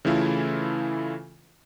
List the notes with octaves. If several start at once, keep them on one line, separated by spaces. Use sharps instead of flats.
C#3 E3 A3 E4 F4 A4